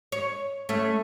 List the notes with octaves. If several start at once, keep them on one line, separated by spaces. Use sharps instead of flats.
C#5
A3 C#4